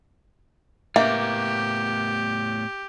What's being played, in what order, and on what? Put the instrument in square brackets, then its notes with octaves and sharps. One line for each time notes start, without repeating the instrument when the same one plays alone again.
[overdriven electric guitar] A2 B3 [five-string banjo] A#3 [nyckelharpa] G4 [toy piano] E5